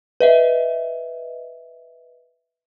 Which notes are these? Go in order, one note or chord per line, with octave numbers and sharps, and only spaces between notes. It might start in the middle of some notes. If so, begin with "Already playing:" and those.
B4 D#5 E5